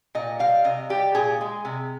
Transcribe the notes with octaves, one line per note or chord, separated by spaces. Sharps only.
A#2 D#5
G3 F5
C3 D#5
G3 G4
A#2 G#4
G#3
C3